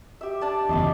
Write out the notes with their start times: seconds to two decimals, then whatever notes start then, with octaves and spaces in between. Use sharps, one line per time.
0.21 G4 E5
0.41 D4 D5 A5
0.69 F#1 E2 D#5 E5 D6